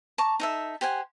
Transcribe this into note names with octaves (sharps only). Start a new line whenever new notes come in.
A5 A#5 C#6 D6
D#4 A4 E5
G4 C5 F#5 G#5